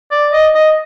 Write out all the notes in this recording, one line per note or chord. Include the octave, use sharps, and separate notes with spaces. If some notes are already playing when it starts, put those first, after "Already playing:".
D5
D#5
D#5